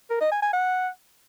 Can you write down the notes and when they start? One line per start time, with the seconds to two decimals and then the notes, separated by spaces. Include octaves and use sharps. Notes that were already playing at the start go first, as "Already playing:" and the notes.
0.10 A#4
0.21 D#5
0.32 G#5
0.43 G#5
0.53 F#5